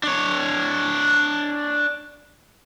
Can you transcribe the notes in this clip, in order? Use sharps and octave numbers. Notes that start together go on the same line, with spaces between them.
D4 C#5